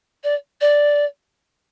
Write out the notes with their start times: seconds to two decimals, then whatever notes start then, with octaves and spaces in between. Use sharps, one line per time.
0.23 D5
0.61 D5